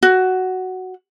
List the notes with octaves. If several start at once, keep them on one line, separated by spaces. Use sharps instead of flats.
F#4